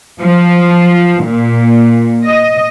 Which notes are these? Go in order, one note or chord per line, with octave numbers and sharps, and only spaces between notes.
F3
A#2
D#5